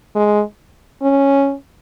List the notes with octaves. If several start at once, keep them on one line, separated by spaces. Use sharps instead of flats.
G#3
C#4